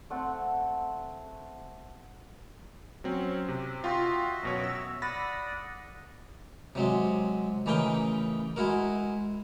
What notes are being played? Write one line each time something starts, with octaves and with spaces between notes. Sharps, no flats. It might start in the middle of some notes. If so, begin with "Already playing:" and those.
A3 C4 F#5 A5
F#3 C4 C#4
C3
F4 F#4 D#5 E5 G5 C6
F#2 B2 C#5
E6
D5 F#5 B5 D#6 A6 A#6
C3 F#3 G#3
A1 C#3 E3 D#4 A#4 G5
G#3 E4 F#4 A#4